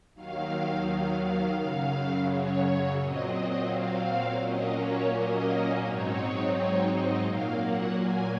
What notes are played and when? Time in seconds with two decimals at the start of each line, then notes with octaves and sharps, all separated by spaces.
0.15 D#2 D#3 F#3 F5
0.85 F5
1.21 F5
1.56 F#2 C#3 F#3 F5
2.28 C#5
2.98 A#2 F#3 C4 D#5
3.34 D#5
3.69 F5
4.40 A#2 F#3 A#3 C#4 D#5
4.75 C#5
5.12 D#5
5.82 G#2 F#3 C4 D#4 C#5
6.53 C#5
6.89 D#5
7.24 A#2 F#3 A#3 F5
7.60 F#5
7.95 G#5